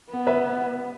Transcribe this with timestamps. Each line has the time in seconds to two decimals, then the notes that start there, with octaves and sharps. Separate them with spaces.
0.09 B3
0.27 B4 E5